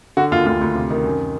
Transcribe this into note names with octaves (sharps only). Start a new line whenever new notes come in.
D3 F#4
D#2 F4
D2 F4
D2
C3
D#3
F#2